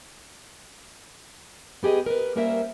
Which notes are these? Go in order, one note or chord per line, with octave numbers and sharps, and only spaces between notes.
B3 G4 G#4 D#5
A#4 B4
G3 A#3 C#4 A#4 C5 E5